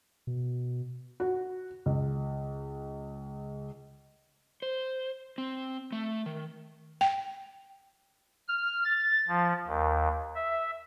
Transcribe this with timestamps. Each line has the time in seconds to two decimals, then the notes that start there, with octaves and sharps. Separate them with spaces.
0.27 B2
1.20 F#4
1.86 C#2
4.62 C5
5.38 C4
5.92 A3
6.26 D#3
7.01 G5
8.48 F6
8.85 A6
9.28 F3
9.67 D#2
10.35 E5